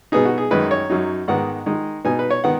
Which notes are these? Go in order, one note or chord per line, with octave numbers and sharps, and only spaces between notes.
B2 B3 D#4 G#4
F#4
G#4
F#2 D#3 G#3 D#4 B4
C#5
F#2 F#3 D#4
G#2 D#3 B3 F#5
D#3 G#3 D#4
B2 B3 D#4 G#5
B4
C#5
D#3 B3 F#5